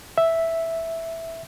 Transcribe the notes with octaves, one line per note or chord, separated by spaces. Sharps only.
E5